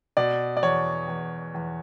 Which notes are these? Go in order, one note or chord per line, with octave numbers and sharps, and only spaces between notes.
B2 D5
D5
E2 C#5
E2
E2